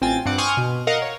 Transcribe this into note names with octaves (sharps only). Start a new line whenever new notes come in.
A1 C4 F4 G5 G#5 A6
G2 C4 F#5 D6
G#5 C6 C#6 D#6 F6 G6
B2
A#4 D#5 F5 F#5
C#5